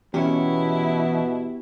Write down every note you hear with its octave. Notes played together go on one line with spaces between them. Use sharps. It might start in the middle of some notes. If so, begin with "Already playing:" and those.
E2 B2 B3 C#4 E4 G4 C#5